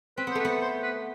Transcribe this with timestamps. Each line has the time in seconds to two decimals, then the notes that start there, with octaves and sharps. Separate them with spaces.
0.17 C4 B4
0.27 B3 C5
0.35 A3 B4
0.45 B3
0.61 C5
0.83 B4